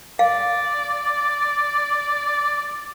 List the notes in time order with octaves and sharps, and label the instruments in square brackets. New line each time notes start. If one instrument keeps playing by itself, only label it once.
[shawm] D5 [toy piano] F5